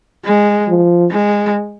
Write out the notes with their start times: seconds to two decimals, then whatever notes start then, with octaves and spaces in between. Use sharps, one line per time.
0.25 G#3
0.69 F3
1.11 G#3